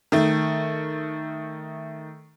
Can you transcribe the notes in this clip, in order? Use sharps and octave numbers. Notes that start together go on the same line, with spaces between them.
D#3 A3